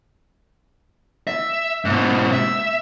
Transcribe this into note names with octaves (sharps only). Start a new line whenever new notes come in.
E5
G#2 B2
E5